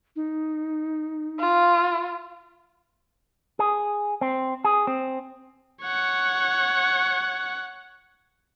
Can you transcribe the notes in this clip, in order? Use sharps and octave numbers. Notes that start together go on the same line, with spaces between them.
D#4
F4
G#4
C4
G#4
C4
C#5 F#5